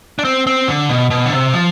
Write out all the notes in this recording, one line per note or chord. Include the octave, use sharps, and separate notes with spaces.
D4
C4
C4
D3
B2
B2
D3
C3
F3